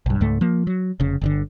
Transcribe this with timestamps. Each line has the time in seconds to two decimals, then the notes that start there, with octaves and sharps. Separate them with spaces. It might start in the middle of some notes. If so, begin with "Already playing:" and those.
0.06 B1 G2
0.21 C#2 G#2 A3
0.41 F3 A#3
0.67 F#3
1.00 F1 C#3
1.21 G1 A#2 D3